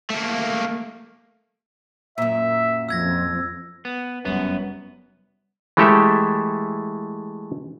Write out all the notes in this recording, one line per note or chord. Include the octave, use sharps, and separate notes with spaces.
A3 A#3
F#2 A#2 E5
F2 E6 G#6 A#6
B3
F1 F#2 G3 B3
E3 G#3 A3 G4 A4 E5